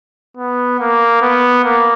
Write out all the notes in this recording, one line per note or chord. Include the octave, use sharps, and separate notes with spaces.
B3
A#3
B3
A#3